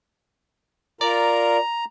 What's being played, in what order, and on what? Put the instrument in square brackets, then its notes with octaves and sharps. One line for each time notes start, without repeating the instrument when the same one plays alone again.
[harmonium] F4 A#4 [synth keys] D5 [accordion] A#5